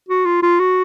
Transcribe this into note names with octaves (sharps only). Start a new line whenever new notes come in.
F#4
F4
F4
F#4